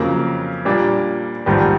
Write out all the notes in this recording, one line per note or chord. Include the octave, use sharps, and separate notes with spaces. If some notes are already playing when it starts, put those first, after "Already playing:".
Already playing: F2 C#3 F#3 A#3
A#2 G3 A#3 D4
A#1 G#2 D#3 G3